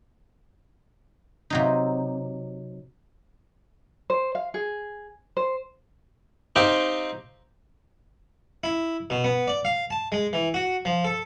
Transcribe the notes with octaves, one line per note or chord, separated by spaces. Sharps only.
C3 F#3 D#4
C5
F5
G#4
C5
C4 D#4 G4 C5 F5 G5
E4
B2
B3
D5
F5
A5
G#3
E3
F#4
F3
A4